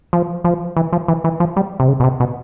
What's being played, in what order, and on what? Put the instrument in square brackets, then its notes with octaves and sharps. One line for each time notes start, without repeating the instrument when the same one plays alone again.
[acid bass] F3
F3
E3
F3
E3
E3
F3
G3
C3
C#3
B2
C3
B2